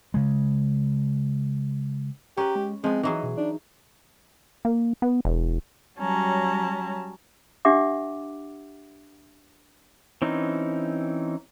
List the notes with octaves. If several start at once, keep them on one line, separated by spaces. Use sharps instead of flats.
C#3 G#3
C#4 G4 B4 A#5
G#3
F3 G#3 B3 C4
E3 F#3 D#4 G#4
B2
D4 D#4
A#3
B3
E1
F#3 G3 C#4 A5 A#5
D4 G4 E5 F#5 D6
E3 C4 C#4 D#4